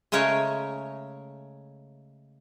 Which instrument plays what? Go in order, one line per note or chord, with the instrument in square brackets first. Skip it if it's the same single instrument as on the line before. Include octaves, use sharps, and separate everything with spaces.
[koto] C#3 G#3 A3 A#4 C#5